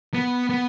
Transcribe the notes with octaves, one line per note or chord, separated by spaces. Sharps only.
B3
B3